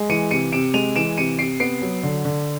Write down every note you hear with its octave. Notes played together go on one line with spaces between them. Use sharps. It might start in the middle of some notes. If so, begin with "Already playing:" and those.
Already playing: G#3
E3 C#7 D#7
C3 C#7 D#7
C3 D7 E7
G#3 D#7 F7
E3 D7 E7
C3 C#7 D#7
C3 C7 D7
B3 C7 D7
F#3
D3
D3